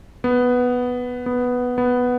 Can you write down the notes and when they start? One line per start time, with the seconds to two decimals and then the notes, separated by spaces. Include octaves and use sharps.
0.24 B3
1.26 B3
1.78 B3